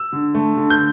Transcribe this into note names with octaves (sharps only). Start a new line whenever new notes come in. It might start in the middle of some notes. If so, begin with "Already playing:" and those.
Already playing: E6
D3
A3
D3
G6